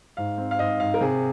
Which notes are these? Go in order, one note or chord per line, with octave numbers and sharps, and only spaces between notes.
G#2 F5
C4
F5
G#2 D#5
G#2 F5
A#4
C3 G#4